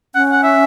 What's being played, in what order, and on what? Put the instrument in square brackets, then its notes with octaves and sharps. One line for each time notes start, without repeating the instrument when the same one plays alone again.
[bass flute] C#4 [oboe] F#5
[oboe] F#5
E5